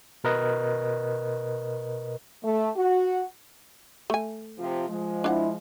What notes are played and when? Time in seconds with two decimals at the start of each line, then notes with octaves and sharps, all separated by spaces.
0.24 B2 A#4 B4 D#5 F#6
2.43 A3
2.76 F#4
4.10 A3 G#5
4.58 C3 F3 F4
4.88 F3 G#3
5.24 D4 E4 F5 F#5